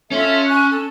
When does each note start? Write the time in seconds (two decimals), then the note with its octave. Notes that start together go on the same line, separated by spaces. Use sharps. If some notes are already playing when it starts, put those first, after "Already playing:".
0.12 C#4 F4 A4 E5
0.47 G#5 C#6 F#6
0.71 A4